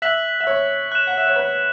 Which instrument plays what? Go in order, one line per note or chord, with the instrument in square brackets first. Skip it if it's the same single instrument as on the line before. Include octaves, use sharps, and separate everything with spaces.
[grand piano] E5 [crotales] F#6 B6 F#7
[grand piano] E5
C#5
[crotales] F#6 E7
[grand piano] F#5
E5
C#5
B4